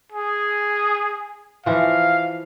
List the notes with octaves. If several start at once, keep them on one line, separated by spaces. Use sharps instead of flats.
G#4
E3 F3 F5